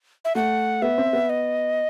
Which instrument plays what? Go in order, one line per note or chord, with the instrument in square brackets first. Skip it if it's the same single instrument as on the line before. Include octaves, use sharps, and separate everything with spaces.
[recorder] E5
[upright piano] A3 [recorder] F#5
[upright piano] B3 [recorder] E5
[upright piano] C4
B3
[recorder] D#5